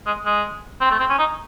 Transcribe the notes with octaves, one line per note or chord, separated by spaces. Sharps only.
G#3
G#3
C4
A3
C4
C#4
D#4